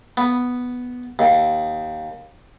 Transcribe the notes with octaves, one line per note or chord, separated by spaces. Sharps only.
B3
D#2